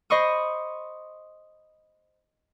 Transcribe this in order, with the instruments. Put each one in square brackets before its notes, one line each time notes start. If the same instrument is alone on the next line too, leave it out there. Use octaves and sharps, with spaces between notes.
[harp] C5 D#5 B5 C#6 D#6